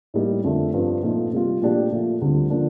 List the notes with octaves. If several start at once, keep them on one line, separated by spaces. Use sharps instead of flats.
A2 G3 A#3 D#4
F2 D3 A3 D4
G2 F3 C4
A#2 F3 A3 D#4
C3 G3 A#3 F4
A#2 F3 A3 D4 G4
A#2 F3 A3
D2 D3 G3 C4 F4
D3 F3 A#3 D4